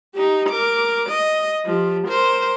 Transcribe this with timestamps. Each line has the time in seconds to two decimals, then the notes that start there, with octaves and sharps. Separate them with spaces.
0.15 D#4 G4
0.49 A#4 D6
1.10 D#5
1.66 F3 G4
2.08 A#4 C5